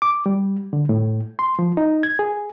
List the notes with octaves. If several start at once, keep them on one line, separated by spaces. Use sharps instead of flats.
D6
G3
D3
A2
C6
F3
D#4
G#6
G#4